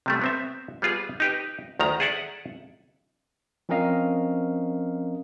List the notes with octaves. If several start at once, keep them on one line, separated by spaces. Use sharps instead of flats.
C3 G3 A3
B3 C4 E5
G3 B3 F4 G#4
D#4 G4 B4
D2 D#3 A#5
G#4 A4 D5 E5 F#5
F3 C4 C#4 A#4 D#5 F5